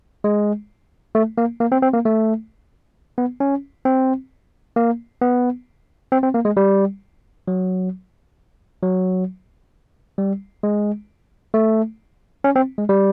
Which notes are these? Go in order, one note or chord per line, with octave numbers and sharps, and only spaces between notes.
G#3
A3
A#3
A#3
C4
C4
A#3
A3
B3
C#4
C4
A#3
B3
C4
C4
A#3
G#3
G3
F#3
F#3
G3
G#3
A3
C#4
C4
G#3
G3